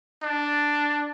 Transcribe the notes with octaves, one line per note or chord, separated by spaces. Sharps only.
D4